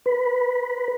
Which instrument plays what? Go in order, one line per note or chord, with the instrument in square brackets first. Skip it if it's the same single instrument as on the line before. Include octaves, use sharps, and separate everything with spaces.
[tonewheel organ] B4